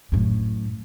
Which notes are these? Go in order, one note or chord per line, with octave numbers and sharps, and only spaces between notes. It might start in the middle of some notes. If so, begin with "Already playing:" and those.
F#2 A2